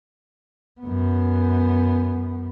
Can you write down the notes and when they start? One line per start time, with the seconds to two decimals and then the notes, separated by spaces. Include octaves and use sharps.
0.81 F#2 B3